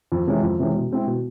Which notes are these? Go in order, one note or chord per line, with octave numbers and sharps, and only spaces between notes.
F2
C3 E3 G#3 C#4
F2
C3 E3 G#3 C#4
B2
G#3 C4 E4
B2